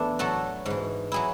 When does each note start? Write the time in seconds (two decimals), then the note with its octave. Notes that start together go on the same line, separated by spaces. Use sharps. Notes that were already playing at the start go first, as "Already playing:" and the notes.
Already playing: E2 E3 A3 B3 D4 E4
0.19 A2 F#3 F#4 A4
0.66 G#2 E3
1.12 F#3 E4 G#4